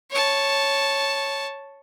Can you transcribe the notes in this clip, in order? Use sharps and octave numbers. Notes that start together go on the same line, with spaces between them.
C#5 A5